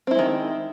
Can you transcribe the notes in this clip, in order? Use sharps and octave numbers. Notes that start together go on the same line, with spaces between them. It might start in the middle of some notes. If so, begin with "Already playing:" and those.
D#3 G#3 C4 E4